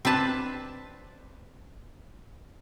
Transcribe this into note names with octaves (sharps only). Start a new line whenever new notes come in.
C4 D4 B4 A5